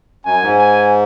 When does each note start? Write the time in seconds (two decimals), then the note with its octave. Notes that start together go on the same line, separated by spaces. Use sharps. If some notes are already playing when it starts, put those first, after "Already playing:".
0.25 F#2 G#5
0.42 G#2
0.58 G#5